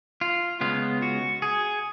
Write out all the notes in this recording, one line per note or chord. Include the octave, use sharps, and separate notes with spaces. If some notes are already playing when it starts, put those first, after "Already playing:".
F4
C#3 G#3 B3 F4
F#4
G#4